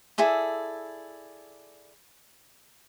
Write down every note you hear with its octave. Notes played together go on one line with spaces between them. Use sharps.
E4 G#4 A4 D5